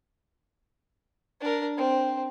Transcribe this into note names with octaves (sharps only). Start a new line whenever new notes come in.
D4 A#4
C4